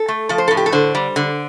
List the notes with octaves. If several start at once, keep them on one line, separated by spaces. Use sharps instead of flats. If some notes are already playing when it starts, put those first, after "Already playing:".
Already playing: A4
A3
F3 A4
C5
A2 A4
G4
A4
D3 C5
G3
D3